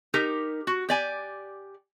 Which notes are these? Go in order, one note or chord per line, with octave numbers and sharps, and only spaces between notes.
D#4 G4 A#4
F#4
G4 D5 G#5